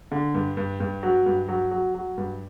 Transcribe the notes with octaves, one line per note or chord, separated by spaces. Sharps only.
D3
G2
G2
G2
F#3
G2
F#3
F#3
F#3
G2